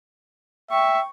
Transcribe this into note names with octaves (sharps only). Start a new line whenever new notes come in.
E5 G5 C#6